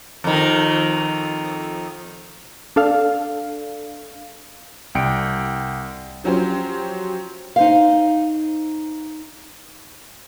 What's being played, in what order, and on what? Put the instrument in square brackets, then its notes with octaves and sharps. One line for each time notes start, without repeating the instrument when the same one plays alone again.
[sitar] F2 D#3
[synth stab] D4 A4 F5
[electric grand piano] C2 G5 C#7 D7
[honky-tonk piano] F3 F#3 C#4 G4 C5
[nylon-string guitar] D#4 C5 F5